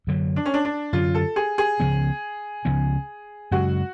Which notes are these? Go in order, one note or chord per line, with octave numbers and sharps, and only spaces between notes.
F#2 D3 F#3
D4
C#4
D4
D4
F#2 D3 F#3 F4
A4
G#4
G#4
C#2 C#3 F3 B3
C#2 C#3 F3 B3
F#2 C#3 G#3 F#4